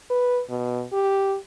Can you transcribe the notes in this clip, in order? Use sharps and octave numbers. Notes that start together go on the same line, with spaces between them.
B4
B2
G4